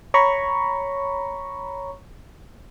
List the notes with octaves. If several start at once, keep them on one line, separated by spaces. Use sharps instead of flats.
C#5 A#5 B5 C#6